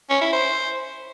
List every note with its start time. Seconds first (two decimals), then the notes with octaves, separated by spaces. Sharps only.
0.10 C#4
0.21 E4
0.32 C5